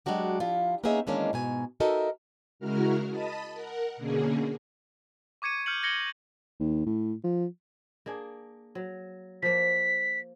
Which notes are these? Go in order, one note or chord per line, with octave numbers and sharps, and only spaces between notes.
F#3 G#3 D4 F#4 G4
F3 E4 F4
A#3 B3 C#4 D#4 G#4 E5
D#3 E3 G#3 A#3 C#4 D4
G#2 B2 G#5
D#4 F#4 A4 A#4 D#5 E5
C#3 G#3 E4 F#4 A#4 F6
D#5 A5 B5 D#6
A#4 F#5
B2 D3 A#3 C#4 G#4
C#6 D6 G#6 C#7 D#7
F6 G6 C#7 F#7
G#6 A#6 C#7 F#7 G7
D#2
A2
F3
A#3 D4 G#4
F#3
F3 A#3 B6